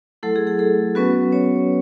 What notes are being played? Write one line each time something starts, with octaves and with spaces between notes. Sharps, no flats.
F#3 A3 E4 A4
G#4
G#4
A3 A4
F#3 B3 C#4 F#4 B4
C#4 C#5